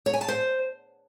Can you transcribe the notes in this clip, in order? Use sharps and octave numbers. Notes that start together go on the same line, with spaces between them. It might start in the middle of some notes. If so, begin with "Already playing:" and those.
C#5
G#5
A5
C5